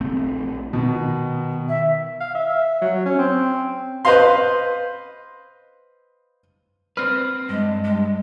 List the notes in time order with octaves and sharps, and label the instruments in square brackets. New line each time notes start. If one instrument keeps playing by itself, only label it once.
[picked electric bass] A#1 A3 C4
[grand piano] B2 [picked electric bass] D#3
[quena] E5
[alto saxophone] F5
E5
F#3
C#4
C4
[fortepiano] B4 C5 D#5 F5 C6
[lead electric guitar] C4 B4 [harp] F6
[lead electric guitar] G2 [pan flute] G#3
[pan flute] G#3